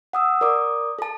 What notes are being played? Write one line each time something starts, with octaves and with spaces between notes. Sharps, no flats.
F#5 D#6 E6
A#4 D5 D6 D#6
A4 A5